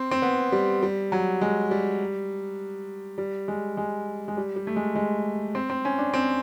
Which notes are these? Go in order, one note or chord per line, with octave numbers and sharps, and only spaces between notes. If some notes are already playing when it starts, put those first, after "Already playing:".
Already playing: C4
C4
B3
G3
G3
F#3
G#3
G3
G3
G#3
G#3
G#3
G3
G3
A3
G#3
G#3
C4
C4
C#4
D4
C4